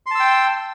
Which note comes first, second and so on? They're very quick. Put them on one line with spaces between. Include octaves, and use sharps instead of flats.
C6 A5 E6 G5